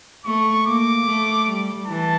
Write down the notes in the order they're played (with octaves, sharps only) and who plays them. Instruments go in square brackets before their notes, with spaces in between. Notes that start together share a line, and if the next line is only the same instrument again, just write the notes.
[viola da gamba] A3 [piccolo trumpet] C#6
[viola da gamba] A#3 [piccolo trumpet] D6
[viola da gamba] A3
G3
[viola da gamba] E3 [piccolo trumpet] A5